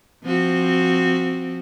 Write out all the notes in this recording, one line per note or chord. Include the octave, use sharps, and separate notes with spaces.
F3 C4 F#4